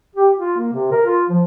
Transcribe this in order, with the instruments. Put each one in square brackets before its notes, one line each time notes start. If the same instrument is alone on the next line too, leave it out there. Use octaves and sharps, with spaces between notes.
[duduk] G4
F4
A#3
C3
A#4
F4
F3